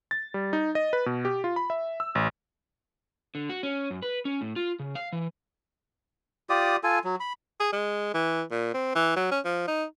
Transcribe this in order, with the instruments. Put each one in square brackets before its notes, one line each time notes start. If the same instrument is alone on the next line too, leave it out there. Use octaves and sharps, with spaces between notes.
[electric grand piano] A6
G3
D#4
D#5
B4
B2
G4
F4
B5
E5
E6
A1
[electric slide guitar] D3
F#4
C#4
F#2
B4
C#4
A2
F4
C#3
F5
E3
[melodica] F4 G4 D5 D#6
F4 A4 G#5
F#3
B5
[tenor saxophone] G#4
G#3
E3
A#2
C4
E3
F#3
C#4
F3
D#4